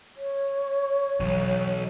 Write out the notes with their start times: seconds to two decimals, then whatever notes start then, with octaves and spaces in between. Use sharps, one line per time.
0.17 C#5
1.20 B1 E3 F#3